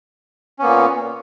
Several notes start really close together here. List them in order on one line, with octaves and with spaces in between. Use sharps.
C#4 B3 A#3 A#2